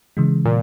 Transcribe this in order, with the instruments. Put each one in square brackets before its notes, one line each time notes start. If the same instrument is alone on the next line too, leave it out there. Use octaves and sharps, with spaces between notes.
[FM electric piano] C#3 E3 G#3
[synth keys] A#2